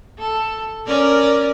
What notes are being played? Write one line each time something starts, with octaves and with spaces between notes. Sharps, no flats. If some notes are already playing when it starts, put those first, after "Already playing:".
A4
C#4 A#4 D5